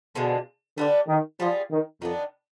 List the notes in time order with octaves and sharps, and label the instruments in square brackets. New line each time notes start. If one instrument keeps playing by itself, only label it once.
[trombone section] B2 [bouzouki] D3 F3 G#3
[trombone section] D3 [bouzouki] G3 B3 D4
[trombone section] D#3
[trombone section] F3 [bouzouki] G3 B3 F4 G#4
[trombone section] D#3
[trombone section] F2 [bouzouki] D#3 B3 D4